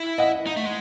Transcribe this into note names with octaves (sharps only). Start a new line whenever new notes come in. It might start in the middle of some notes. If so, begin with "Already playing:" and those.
Already playing: E4
D#5 F#5
D#4
A3
G#3